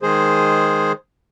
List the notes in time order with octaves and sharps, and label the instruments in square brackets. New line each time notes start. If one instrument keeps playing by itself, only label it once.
[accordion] D#3 G#3 G#4 C5